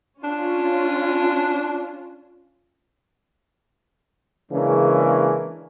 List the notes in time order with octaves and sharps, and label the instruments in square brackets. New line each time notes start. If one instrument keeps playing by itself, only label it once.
[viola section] C#4 F4 [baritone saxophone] D4
[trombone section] C#3 E3 G#3 A#3 C#4 D4